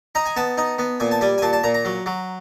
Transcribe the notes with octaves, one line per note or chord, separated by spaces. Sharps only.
D#4 A#5
G#5
B3 A5
D#4
B3
A#2 G#5
A5
G3 G#5
G#5
A#2 A5
A5
A#2 A#5
A#5
F#3
F#3